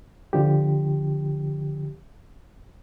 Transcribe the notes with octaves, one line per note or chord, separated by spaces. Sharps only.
D3 F3 G4